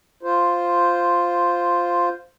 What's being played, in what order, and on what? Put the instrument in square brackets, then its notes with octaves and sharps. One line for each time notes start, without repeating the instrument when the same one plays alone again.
[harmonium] F4 C5